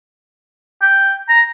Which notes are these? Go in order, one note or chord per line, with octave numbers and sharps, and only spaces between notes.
G5
A#5